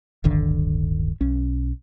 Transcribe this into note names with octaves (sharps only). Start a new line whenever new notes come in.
D1 G1 D3 D#3
B1 C#4